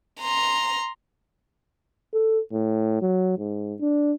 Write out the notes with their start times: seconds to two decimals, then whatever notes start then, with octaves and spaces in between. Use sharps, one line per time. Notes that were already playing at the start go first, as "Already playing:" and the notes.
0.21 A#5 C6
2.14 A4
2.52 A2
3.02 F#3
3.38 G#2
3.80 D4